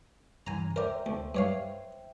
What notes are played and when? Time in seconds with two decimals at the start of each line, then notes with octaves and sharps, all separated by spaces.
0.47 G2 C#3 E3 G#5 A#5
0.76 A#4 C5 D5 E5 G5
1.06 D2
1.35 G2 C#5 F5